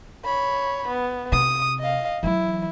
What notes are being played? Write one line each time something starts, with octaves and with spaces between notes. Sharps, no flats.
C#5 B5
B3
C3 D#6
D#5 F5
E3 F#3 E4